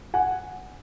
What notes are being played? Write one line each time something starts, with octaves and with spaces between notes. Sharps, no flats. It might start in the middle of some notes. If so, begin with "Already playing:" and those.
F#5 G#5